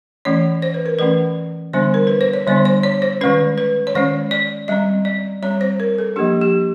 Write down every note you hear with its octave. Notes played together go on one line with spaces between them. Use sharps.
E3 A3 C#4 C#5
C5
B4
A#4
E3 A3 C#4 B4
D3 G3 B3 D4 C5
A#4
B4
C5
C#5
D3 G3 B3 D4 D5
C5
C#5
C5
D#3 G#3 C#4 B4
B4
C#5
D#3 G#3 C#4 C5
D5
G3 C4 D#5
D5
G3 C4 C#5
C5
A#4
A4
F3 A#3 D4 G4
G4